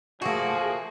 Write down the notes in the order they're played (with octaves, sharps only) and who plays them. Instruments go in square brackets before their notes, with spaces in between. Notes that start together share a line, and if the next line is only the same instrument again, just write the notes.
[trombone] F3 [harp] A3 E7 [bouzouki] A#3 F#4 [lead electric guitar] G#4